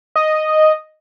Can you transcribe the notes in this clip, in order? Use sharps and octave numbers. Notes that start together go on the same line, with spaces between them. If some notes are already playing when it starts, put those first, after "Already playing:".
D#5